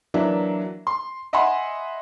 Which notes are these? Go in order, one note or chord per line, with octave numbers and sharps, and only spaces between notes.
E3 F#3 A#3 D4 E5
C6
D#5 E5 F#5 G#5 B5 C6